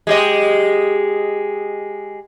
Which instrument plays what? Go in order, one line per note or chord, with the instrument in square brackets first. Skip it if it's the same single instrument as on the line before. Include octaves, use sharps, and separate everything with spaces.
[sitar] G#3 G4 D#5